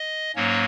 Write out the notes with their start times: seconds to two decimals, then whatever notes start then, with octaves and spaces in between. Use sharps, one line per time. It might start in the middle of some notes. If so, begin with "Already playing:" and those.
Already playing: D#5
0.35 G#2 F#3 A#3 C#4 C#5